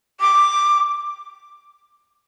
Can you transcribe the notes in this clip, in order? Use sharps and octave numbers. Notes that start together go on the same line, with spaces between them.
D6